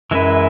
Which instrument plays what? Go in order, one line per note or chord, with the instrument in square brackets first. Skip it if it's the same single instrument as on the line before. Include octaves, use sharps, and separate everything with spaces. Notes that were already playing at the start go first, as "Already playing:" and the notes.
[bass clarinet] F#2 [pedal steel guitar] E3 G#3 E4 B4